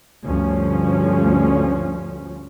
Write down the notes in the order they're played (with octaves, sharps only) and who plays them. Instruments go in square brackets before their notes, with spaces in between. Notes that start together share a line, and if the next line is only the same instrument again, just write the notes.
[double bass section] D2 G2 F3 C#4